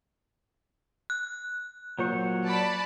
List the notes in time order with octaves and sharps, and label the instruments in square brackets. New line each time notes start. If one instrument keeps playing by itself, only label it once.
[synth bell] F#6
[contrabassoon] A#2 [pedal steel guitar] F#3 C5 C#6
[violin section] D5 A5 B5